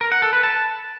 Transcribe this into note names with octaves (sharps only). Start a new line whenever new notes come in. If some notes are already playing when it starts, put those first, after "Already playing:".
A#4
F#5
A4
B4
A5